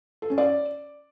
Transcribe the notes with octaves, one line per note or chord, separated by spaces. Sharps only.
A4
C#4
D5